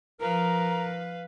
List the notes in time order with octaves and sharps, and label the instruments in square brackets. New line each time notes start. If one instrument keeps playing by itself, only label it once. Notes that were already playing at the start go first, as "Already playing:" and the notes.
[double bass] F3 [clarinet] A#4 [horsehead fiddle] B4 F5 [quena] A#5